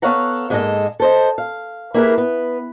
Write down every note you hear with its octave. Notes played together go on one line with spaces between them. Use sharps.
B3 A4 C#5 F5 F#5 A#5
G#2 G#3 A#3 D4 A4 D#5
A4 C5 D#5
F5
A#3 E4 G4 G#4 A#4 B4
B3